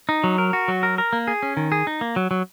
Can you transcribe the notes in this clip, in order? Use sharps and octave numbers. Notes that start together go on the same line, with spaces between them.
D#4
F#3
A#4
F#4
F#3
A#4
A#4
A#3
G#4
C#4
D#3
G#4
D#4
A#3
F#3
F#3